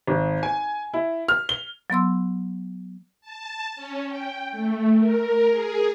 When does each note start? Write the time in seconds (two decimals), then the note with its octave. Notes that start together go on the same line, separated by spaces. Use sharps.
0.07 G#1
0.43 G#5
0.94 E4
1.28 F6
1.49 G7
1.90 F#3 B3 C6 E6
3.21 A5
3.76 C#4
4.08 G5
4.52 A3
4.98 A#4
5.50 G#4